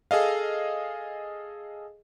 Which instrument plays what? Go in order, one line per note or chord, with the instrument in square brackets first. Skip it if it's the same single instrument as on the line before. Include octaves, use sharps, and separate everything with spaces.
[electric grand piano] G#4 A4 D#5 F5